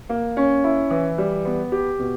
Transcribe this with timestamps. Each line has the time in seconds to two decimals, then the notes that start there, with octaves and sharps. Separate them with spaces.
0.09 A#3
0.37 C#4
0.64 E4
0.90 E3
1.18 G3
1.45 B3
1.72 G4
1.99 B2